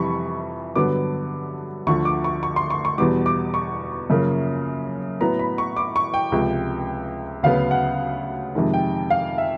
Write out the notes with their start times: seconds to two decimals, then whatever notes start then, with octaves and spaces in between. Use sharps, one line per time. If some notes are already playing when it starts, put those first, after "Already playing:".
Already playing: F2 C3 E3 G3 B5 C#6
0.76 G2 D3 F#3 B3 D6
1.87 D2 D3 F3 C#6
2.05 D6
2.24 C#6
2.43 C#6
2.56 C6
2.70 C#6
2.85 C#6
2.98 E2 B2 G3 D6
3.26 D6
3.54 C#6
4.10 F#2 C#3 F3 A#3
5.21 A2 F#3 B3 A#5
5.39 B5
5.58 C#6
5.77 D6
5.96 C#6
6.14 G5
6.32 C#2 C3 F3
7.43 D2 C#3 F#3 B3 F5
7.71 F#5
8.55 F2 C3 D#3 G#3
8.74 G5
9.10 F5
9.38 E5